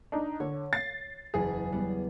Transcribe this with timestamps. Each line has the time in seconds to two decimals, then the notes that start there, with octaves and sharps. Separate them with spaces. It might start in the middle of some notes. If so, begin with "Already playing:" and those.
0.12 D4 D#4
0.40 D3 C#5
0.73 A6 C7
1.34 F#1 E2 G#4
1.72 G3 B3